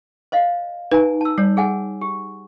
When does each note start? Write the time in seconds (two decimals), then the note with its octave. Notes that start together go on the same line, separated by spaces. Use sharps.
0.32 C5 D#5 F5
0.91 D#4 B4 G#5 A#5
1.21 A5 E6
1.38 G3 C#5
1.57 G#4 F#5 G#5
2.01 G4